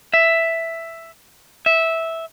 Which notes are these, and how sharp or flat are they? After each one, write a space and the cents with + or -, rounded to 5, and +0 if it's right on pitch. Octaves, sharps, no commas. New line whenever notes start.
E5 +5
E5 -10